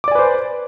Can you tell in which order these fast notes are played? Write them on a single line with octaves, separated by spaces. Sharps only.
D6 D5 G#5 B4 C5